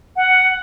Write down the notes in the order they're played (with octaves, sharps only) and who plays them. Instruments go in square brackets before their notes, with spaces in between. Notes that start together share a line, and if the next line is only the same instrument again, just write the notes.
[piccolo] F#5